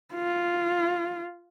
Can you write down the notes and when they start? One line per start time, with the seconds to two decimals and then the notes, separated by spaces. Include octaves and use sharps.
0.15 F4